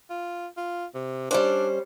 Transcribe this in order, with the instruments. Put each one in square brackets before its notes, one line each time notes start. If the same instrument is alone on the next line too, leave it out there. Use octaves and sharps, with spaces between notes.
[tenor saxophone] F4
F4
C3
[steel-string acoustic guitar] G3 C#4 C5 [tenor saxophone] D4